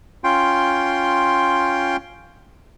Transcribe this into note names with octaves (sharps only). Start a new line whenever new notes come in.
C#4 F4 G5 C6